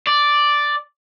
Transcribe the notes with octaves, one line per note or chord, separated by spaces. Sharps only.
D5